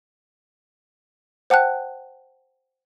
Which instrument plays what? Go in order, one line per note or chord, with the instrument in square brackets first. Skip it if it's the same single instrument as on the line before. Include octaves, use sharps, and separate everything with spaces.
[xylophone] C5 F#5 G5 A5 F#6